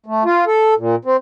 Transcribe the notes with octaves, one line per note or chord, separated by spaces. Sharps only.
A3
F4
A4
A#2
C4